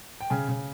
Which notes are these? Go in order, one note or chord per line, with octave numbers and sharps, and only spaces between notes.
G5
C#3 G#5
C#3